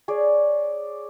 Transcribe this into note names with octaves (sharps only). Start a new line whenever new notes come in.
G#4 C#5 D5